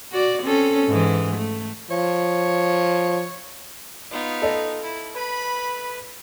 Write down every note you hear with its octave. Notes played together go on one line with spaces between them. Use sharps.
F#4 D5
C4 C#4 A4
G#2 E3
A3
F3 C#5
B3 D#4 F4
A4 D#5
E4
B4 B5